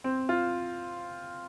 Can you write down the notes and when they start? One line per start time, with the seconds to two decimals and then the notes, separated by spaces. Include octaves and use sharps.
0.04 C4
0.29 F4